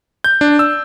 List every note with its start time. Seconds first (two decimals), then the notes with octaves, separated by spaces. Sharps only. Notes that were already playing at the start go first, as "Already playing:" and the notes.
0.24 G6
0.41 D4
0.59 E6